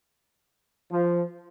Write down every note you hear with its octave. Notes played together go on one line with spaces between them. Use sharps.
F3